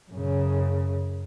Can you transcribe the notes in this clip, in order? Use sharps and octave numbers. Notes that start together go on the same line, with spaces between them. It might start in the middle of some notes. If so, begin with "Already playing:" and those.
F#2 C#3